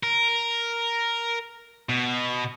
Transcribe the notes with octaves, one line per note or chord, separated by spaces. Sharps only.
A#4
B2